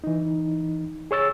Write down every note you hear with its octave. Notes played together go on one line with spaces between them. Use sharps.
E3 D#4
G#4 C#5 E6 A6